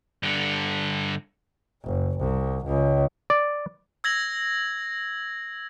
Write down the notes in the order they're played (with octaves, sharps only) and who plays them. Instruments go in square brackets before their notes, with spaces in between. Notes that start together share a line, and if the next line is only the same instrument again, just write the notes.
[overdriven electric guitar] G2 D3
[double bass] F#1
C2
C#2
[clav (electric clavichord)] D5
[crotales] E6 G#6 A#6 F#7